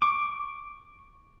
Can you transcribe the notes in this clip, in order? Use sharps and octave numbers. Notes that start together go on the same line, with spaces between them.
C#6 D6